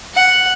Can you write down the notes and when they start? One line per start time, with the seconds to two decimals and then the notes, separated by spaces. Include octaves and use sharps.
0.14 F#5